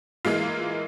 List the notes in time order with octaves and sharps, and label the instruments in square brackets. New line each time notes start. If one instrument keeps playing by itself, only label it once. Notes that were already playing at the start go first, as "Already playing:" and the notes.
[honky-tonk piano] E3 G#3 A#3 F4